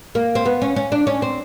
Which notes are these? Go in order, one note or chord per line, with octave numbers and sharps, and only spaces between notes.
A#3
C4
B3
C#4
C#4
D4
C#4
C4